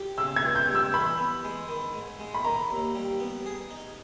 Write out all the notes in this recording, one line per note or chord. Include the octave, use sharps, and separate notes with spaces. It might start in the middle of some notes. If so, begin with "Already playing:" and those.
Already playing: G4
C#3 E6
G#6
C#2
G6
G3
E6
E3 B5
B3
G#3
D#3
G#2
G#3
B5
D#3 A#5
D#2
G3
B3
G#4
D#4